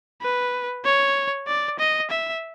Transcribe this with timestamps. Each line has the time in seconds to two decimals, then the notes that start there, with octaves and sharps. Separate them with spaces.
0.22 B4
0.85 C#5
1.47 D5
1.79 D#5
2.10 E5